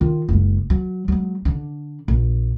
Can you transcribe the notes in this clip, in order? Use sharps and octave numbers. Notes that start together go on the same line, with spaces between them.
D#3 F4
F#1 G#3
F#3
F#3 G#3
D3 D4
A#1